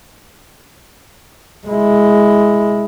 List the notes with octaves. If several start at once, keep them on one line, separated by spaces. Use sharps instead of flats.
G#3 E4